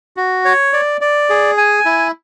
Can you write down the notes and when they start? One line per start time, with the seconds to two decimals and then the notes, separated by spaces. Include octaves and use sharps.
0.17 F#4
0.45 C#5
0.73 D5
1.01 D5
1.30 G#4
1.58 G#5
1.85 E4